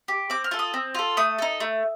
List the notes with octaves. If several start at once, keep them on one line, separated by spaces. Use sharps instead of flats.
G4
C4 D6
F6
F4 A4
D#6
C4
F4 A4
A3 D#6
D#4 A4
A3